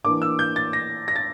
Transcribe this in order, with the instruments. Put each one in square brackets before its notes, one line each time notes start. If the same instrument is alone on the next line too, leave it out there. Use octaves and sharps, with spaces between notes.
[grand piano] E3 A#3 D4 D6
E6
G6
A6
A#6
A#6
A6